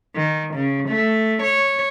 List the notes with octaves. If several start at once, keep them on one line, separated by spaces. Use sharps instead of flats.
D#3
C#3
A3
C#5